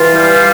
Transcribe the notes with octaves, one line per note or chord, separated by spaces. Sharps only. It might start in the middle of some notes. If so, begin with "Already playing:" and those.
Already playing: E3 F4 F5
G3